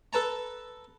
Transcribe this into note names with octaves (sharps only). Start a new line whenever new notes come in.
A4 B4 A5 A#5